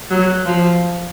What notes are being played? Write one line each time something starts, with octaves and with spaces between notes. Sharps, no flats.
F#3
F3